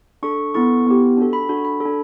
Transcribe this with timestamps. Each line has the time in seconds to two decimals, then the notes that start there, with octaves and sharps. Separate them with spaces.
0.23 D4 A4 C#6
0.54 B3 E4 A4 C#6
0.87 B3 E4 G4
1.17 D4 F#4 A4
1.33 B5
1.49 D4 F#4 A4
1.65 B5
1.81 D4 A4